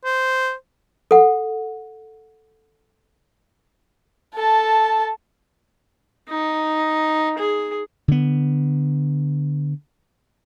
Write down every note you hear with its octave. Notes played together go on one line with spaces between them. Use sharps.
C5
A4 F#5
A4 A5
D#4
G#4
D3 B3